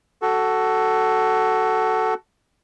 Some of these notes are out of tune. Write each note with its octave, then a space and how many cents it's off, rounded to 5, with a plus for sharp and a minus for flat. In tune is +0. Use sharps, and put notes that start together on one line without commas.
F#4 +15 A4 +0